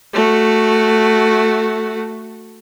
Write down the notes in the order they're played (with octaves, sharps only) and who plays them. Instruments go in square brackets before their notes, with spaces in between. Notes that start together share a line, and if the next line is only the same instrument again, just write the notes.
[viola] A3 F#4